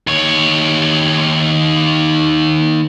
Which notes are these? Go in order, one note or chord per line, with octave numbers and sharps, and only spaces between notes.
D#2 C#5